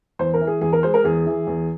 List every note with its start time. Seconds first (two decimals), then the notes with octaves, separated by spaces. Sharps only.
0.19 E2 C5
0.34 A#4
0.41 E3
0.47 G#4
0.61 E2 G#4
0.73 A#4
0.83 G#3 C5
0.94 A#4
1.04 E2 G#4
1.26 E3
1.47 E2